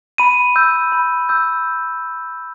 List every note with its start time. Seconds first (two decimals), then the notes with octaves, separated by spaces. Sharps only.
0.18 B5 D#7
0.56 E6 G6
0.92 B5
1.29 E6 G6